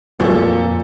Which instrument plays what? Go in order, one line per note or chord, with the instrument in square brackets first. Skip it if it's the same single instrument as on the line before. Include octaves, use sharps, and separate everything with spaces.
[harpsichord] B1 E3 F#4 [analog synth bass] F2 [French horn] A#2 [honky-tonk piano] F3 A4